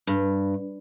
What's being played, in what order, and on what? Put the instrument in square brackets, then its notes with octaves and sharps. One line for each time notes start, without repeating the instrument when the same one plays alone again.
[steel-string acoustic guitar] G2